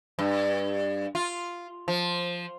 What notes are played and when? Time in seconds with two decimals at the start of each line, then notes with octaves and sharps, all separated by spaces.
0.19 G2
1.15 F4
1.88 F3